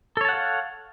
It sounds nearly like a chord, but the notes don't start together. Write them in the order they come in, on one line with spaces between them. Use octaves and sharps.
A4 C#5 A5 F#5 F5